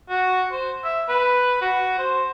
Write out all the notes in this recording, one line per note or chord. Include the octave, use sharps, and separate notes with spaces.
F#4
C5
E5
B4
F#4
C5